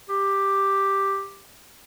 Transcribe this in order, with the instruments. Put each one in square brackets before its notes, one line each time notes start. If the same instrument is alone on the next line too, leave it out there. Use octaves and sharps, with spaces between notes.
[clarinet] G4